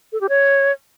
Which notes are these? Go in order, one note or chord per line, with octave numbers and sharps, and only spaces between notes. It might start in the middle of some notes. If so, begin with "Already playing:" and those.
A4
G4
C#5